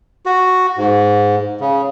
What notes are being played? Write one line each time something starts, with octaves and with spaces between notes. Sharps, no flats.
F#4
G#2
C#3